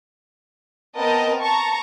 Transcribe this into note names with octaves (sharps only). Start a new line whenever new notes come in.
B3 C4 A#4 D#5 G5 A5
A5 A#5 C#6